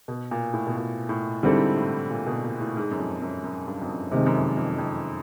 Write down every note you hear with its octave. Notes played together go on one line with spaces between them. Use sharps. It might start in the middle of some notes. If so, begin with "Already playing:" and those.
B2
A#2
A2
B2
A#2
A2
G#2 D3 G3 C4 E4 A4
A2
A#2
B2
A#2
A2
G#2
F#2
F2
F#2
F#2
G2
F2
F#2
F2 C3 D#3 G#3
F#2
F2
F2
F2